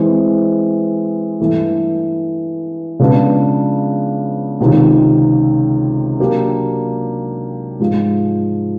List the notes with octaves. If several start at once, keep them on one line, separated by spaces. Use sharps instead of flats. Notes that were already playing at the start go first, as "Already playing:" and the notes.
Already playing: E3 G#3 C4
G2 E3 A3
C#3 F3 G#3 B3 D4
C#2 C3 D#3
F#3 A#3 D4 G4
G#2 F3 G#3